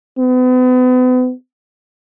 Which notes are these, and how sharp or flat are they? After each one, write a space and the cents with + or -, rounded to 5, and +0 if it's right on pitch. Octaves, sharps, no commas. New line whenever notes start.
B3 +40